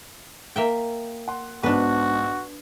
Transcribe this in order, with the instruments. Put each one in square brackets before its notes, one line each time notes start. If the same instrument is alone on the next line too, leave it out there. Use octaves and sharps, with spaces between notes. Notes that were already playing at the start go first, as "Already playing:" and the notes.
[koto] A#3 E5 G5
[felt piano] F#5 C6
[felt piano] B1 G#2 B2 [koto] D4 B4 [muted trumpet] F#4